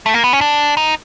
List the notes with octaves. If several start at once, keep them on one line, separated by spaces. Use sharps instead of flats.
A3
A#3
B3
C#4
D4
D#4